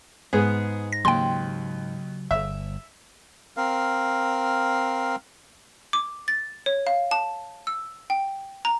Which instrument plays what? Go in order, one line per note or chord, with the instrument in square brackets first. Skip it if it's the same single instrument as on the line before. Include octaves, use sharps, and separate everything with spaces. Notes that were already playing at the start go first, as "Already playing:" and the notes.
[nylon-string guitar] G#2 [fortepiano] B3 G#4
[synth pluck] A#6
[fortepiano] D#2 [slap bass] C#3 F#3 [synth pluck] G5 C6
[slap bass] G1 [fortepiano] E5
[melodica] C4 A#4 F5
[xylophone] D6
A6
C#5
F5
A5
E6
G5
A#5